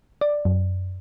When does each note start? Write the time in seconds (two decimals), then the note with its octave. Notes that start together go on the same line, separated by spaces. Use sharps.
0.21 D5
0.45 F#2